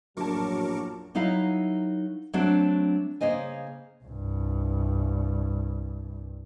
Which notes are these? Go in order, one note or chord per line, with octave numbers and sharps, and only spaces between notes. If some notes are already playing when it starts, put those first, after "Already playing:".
A#1 F#2 A2 F#3 A#4 A5 C#6 D6
F#3 D#4 E4 A#4 F5
F#3 A3 C4 D4 F#4
C#3 A#3 C5 D#5 G#5
C2 G2